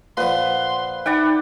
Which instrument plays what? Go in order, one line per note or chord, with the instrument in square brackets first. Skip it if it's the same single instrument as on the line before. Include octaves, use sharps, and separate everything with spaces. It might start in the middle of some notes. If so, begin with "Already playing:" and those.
[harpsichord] A#2 F3 [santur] B4 [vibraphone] F#5 [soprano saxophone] C6
[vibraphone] D#4 B5 [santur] D5 F#5 G5 [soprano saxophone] E5